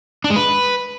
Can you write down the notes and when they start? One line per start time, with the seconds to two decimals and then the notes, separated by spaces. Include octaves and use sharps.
0.24 D4
0.30 G#3
0.36 B4